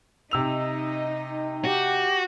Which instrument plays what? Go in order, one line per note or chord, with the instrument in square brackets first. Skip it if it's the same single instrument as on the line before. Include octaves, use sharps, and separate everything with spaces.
[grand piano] C3 E6 F7 [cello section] D#4
[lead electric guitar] F#4 [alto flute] G4